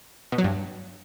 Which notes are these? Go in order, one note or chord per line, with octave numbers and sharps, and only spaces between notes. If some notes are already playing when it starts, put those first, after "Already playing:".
B2
F#3
G2